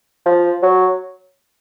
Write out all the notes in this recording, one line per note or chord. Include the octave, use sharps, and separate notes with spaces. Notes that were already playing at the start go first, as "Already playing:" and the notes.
F3
F#3